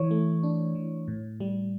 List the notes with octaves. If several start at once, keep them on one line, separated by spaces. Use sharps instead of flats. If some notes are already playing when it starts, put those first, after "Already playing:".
Already playing: E3 C#5
A3
D4
E3
A2
G3